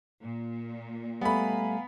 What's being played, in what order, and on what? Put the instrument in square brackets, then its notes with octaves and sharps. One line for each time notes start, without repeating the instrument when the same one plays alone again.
[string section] A#2
[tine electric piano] G3 A3 [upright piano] B3 B5 [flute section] F5 G#5 A#5